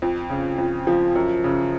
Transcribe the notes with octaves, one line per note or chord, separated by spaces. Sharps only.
F2
C#3
F2
F3
F#2
C#3